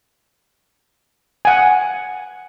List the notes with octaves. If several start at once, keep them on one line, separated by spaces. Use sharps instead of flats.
F#5 G#5